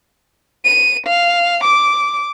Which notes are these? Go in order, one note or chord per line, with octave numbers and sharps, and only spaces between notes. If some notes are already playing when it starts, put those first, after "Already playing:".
D#7
F5
D6